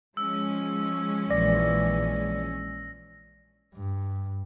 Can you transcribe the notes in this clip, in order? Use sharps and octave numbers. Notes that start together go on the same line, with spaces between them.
F3 G#3 C#4 E6
A#1 E3 D5 A#6
G2